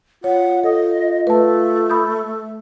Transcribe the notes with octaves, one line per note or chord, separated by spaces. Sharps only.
F4 C#5 F#5
A4 D#5 D#6
A3 B4 A5
B5 D#6 G6